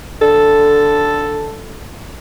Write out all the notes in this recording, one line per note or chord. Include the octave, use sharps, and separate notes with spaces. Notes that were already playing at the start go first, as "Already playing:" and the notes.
D3 A4